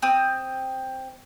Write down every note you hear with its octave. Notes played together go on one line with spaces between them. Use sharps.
C4 D#6